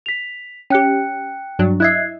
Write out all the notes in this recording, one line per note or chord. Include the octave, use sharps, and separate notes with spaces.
B6 F7
C#4 G4 G5 F#6 C#7
G2 F#3 D4
E4 D#5 E5 F#6 G#6 C7